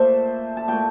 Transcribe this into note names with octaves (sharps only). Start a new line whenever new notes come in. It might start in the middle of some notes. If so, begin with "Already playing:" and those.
Already playing: A#2 A3 A4 C5 E5
A5
A#2 A3 E5 G5